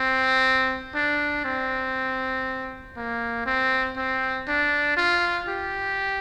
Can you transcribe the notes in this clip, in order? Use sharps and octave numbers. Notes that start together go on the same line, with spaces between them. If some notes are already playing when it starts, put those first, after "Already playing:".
Already playing: C4
D4
C4
A#3
C4
C4
D4
F4
G4